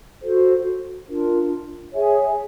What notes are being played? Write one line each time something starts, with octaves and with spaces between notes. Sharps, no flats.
F#4 A4 C5
D4 F4 A#4
G#4 C#5 E5 G#5